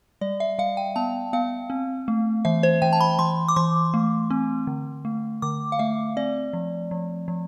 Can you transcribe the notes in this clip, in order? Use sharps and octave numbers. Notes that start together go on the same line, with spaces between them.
G3 D5
E5
G3 F5
G5
B3 A5
B3 F5
C4
A3
E3 E5
C5
E3 G5
A5
B5
E3 C6
D6
E3 C6
A3
C4
D3
A3
D3 D6
F5
A3 E5
C4 D5
F3
F3
F3